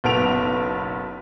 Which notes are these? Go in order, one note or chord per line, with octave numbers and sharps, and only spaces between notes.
F#1 B1 B3 A4 D7 F7